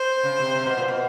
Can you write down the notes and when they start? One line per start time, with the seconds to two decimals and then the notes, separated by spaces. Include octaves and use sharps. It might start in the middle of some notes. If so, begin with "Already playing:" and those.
Already playing: C5
0.24 C#3
0.40 C3
0.55 C3
0.66 B2
0.77 A#2
0.88 B2